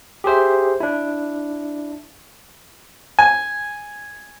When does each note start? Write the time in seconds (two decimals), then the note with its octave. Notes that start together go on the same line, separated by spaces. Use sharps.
0.24 G4 G#4 C5 E5
0.80 D4 E4
3.19 G#5